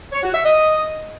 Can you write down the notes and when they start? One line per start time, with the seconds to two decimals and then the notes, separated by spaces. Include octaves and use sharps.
0.12 C#5
0.23 F#4
0.34 E5
0.45 D#5